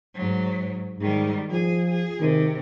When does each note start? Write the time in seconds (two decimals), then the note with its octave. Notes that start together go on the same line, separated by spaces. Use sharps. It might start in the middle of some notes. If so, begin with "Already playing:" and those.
0.14 G#2 F#3
1.00 G#2 D#3 G3
1.51 F3 G#4
1.90 G#4
2.21 C3 D#3